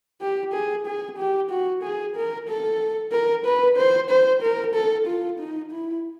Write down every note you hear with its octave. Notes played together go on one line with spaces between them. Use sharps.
G4
G#4
G#4
G4
F#4
G#4
A#4
A4
A#4
B4
C5
C5
A#4
A4
F4
D#4
E4